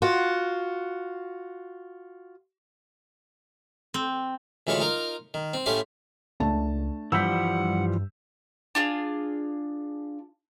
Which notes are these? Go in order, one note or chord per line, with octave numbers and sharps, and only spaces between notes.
F4 F#4
C4
D2 E3 G#3 F4 C#5 B5
D#4 F4 A#4
D#3
C4
A2 A3 C#4 G4 F5 C6
C#2 A3 D4 A5
G2 E3 F3 G3 F#5 E6 G6 B6
D4 F4 G#4